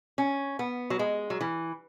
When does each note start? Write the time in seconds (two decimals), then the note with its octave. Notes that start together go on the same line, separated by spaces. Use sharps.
0.18 C#4
0.59 B3
0.90 F#3
0.99 G#3
1.30 F#3
1.41 E3